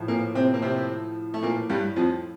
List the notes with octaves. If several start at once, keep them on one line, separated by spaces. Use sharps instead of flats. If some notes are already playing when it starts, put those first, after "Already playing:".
Already playing: A2 F3
A#2 A#3
C3 C4
A#3
C3 C4
A3
A#2 A#3
G2 G3
F2 F3